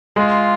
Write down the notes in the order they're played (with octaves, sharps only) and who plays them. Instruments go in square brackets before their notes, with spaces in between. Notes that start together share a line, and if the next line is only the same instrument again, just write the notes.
[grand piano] G#3 [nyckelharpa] F4